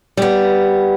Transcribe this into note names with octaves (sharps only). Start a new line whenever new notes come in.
G3 B3